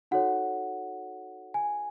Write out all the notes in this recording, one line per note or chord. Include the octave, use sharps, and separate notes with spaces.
D#4 F#4 A4 C#5 F#5
G#5